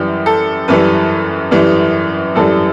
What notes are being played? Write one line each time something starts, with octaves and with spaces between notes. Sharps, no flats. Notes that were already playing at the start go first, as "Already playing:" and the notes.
Already playing: F#2 E3 G3 G4
A4
F#2 E3 G3 B4
F#2 E3 G3
F#2 E3 G3 A4